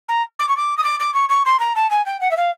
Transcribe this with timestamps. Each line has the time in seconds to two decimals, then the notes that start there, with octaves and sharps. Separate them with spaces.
0.08 A#5
0.39 D6
0.48 C#6
0.56 D6
0.77 D#6
0.83 D6
1.00 D6
1.14 C#6
1.29 C#6
1.45 C6
1.59 A#5
1.75 A5
1.90 G#5
2.06 G5
2.20 F#5
2.31 E5
2.36 F5